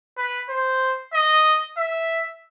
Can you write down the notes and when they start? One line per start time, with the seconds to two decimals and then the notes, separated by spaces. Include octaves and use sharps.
0.18 B4
0.49 C5
1.14 D#5
1.78 E5